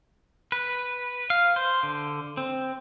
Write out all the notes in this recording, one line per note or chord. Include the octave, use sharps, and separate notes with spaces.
B4
F5
C5
D3
C4